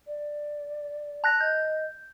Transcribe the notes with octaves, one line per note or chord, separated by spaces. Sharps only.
D5
A5 F#6 A#6
D#5 G6